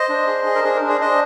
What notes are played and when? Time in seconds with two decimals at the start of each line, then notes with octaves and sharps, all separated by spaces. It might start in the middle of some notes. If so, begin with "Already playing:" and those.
Already playing: C5 D#5
0.09 D4
0.27 G#4
0.46 G#4
0.55 A#4
0.64 D4 G#4 C5
0.76 A#4
0.82 D4
0.89 G#4 C5
1.01 D4 C5 D#5